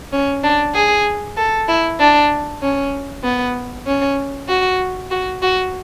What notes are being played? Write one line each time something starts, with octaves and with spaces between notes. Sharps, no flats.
C#4
D4
G#4
A4
E4
D4
C#4
B3
C#4
F#4
F#4
F#4